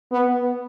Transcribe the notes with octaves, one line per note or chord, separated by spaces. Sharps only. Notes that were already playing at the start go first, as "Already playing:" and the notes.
B3